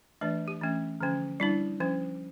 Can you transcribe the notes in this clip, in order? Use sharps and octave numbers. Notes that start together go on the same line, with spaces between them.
E3 A3 D4 D5
G4
E3 A3 C#4
D3 F3 C#4
G3 D4 E4
F3 C#4